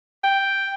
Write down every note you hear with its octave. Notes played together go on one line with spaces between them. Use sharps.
G5